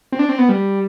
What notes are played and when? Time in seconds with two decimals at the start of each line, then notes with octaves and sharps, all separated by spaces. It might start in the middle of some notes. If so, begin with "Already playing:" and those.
0.12 C4
0.19 D4
0.29 C4
0.38 B3
0.49 G3